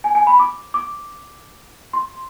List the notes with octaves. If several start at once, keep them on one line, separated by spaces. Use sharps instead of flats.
G#5
G#5
B5
D6
D6
C6